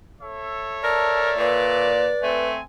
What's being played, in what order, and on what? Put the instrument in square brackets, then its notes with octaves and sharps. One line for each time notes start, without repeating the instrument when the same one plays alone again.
[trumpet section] A4 C#5 E5
[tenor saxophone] A#4 [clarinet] D5 [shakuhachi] A5
[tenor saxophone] A#2 [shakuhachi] B4
[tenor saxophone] A3 [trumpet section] C4 C5 G#5